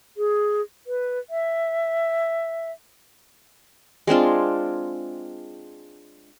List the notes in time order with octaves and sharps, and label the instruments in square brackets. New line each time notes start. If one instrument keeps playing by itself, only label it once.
[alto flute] G#4
B4
E5
[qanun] G#3 C4 D4 F4